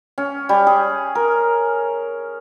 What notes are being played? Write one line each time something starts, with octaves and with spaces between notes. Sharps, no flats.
C#4
G3
G#4
A#4